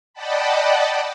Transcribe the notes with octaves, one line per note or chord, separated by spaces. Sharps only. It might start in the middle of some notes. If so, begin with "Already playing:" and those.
D5 D#5 F#5 G5 A5 B5